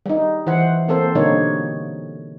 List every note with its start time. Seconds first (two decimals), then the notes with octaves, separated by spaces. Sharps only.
0.06 G3 D#4
0.47 E3 C5 F#5
0.88 A#3 C4 A4 C5
1.15 B2 D3 G3 A#3 D#4 C#5